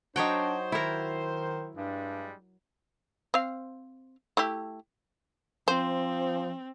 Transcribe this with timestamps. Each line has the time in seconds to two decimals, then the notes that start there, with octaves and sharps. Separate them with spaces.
0.16 F#3 D4 D#4 F#4 C5 C#5 G5
0.72 D#3 E4 A#4
1.76 G2 G3 G#3 D4
3.34 C4 F5
4.37 A3 E4 G4
5.68 F3 C4 C5